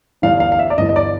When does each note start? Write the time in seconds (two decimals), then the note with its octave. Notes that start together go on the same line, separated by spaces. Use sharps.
0.22 G1 G2 E3 F5
0.40 F5
0.52 F5
0.59 E5
0.70 D5
0.77 G1 G2 E3 D#5
0.89 D#5
0.96 D5